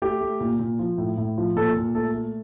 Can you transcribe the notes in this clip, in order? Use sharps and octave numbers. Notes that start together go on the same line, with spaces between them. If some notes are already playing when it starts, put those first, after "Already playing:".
A3 G4
A3
A#2
A#2
F3
A2
A2
F3
A#2 A4
A#2
A3 A4
A3